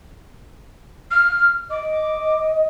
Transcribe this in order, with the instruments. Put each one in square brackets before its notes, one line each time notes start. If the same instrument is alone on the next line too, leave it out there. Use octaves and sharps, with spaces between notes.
[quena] F6
[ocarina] D#5 [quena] D6